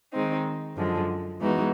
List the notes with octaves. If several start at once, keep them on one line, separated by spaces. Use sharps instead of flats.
D#3 G#3 C4 D#4
F#2 D3 F3 G#3
E3 G#3 B3 D#4 F#4